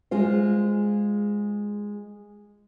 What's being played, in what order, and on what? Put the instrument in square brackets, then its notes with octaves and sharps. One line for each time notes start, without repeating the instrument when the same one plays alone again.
[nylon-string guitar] G#3 F4 C5